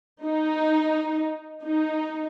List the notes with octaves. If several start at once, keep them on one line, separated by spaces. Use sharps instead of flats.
D#4
D#4